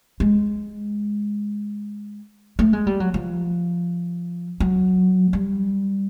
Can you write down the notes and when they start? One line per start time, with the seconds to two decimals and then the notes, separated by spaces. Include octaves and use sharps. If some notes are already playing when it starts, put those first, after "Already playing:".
0.20 G#3
2.59 A3
2.73 G#3
2.87 G3
3.00 F#3
3.14 F3
4.60 F#3
5.33 G3